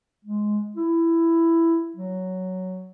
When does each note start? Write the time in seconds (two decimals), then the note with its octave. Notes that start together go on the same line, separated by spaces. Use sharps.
0.25 G#3
0.76 E4
1.97 F#3